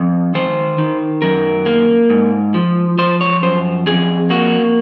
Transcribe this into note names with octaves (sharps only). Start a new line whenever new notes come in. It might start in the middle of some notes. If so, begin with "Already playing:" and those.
Already playing: F2
D#3 C5
D#3
F#2 A#4
A#3
G#2
F3
F3 C5
C#5
F#2 C5
F2 G#4
A#3 F#4